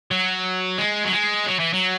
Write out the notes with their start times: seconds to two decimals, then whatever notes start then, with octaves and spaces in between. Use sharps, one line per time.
0.11 F#3
0.78 G#3
1.04 F#3
1.12 G#3
1.47 F#3
1.59 E3
1.73 F#3